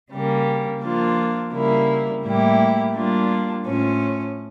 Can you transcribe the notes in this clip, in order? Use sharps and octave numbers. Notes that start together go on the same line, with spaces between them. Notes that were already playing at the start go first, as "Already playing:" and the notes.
C#3 G3 A#3
F3 A#3 D4 F4
C#3 G3 A#3 E4
A2 G3 A#3 E4 G4
G3 A#3 D4 F4
A2 F3 C#4